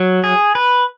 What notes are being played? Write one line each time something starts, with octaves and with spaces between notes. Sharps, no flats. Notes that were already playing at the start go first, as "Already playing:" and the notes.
Already playing: F#3
G#4
B4